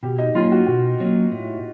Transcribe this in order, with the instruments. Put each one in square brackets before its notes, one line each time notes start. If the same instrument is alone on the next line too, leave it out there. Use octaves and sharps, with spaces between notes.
[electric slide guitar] B2 [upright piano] G4
[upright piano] D#4
[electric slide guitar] F#3 A#3 C#4 [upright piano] F4
[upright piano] F#4
[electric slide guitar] B2 [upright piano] F#4
[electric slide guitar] F#3 A#3 C#4
A2